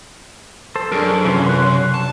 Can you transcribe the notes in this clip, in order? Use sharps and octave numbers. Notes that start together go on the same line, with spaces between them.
A4 C5 A5
F#2 D4 G#4 A#4
C3 E3 C#4 F4
C6 F#6
A5